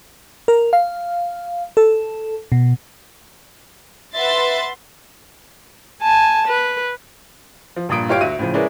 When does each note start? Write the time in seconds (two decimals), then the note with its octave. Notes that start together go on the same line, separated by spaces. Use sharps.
0.48 A#4
0.73 F5
1.77 A4
2.52 B2
4.16 B4 E5 F#5 C6 A6
6.03 G#5 A5
6.48 B4
7.76 F3
7.89 A#1 G2 A#2 D#6 D7
8.09 G1 F4 G4 C#5 F5 D7
8.21 D2 F#4 E5 D#7
8.39 A2 C#3 F3
8.54 G#3 C#4 E4 A#4 B4 D5